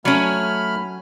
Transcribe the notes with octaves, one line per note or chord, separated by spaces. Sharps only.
F#3 A3 C#4 B5 F6